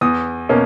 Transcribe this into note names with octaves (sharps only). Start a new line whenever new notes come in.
E2 D#6
B2 A#3 C#4